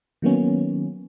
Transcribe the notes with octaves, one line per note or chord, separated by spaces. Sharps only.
D#3 F#3 A#3 B3 C#4